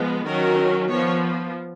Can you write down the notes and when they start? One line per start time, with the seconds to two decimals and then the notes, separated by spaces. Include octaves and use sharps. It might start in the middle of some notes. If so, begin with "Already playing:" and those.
Already playing: F3 G#3 B3
0.25 D#3 F#3 C#4 A#4
0.90 F3 B3 C#5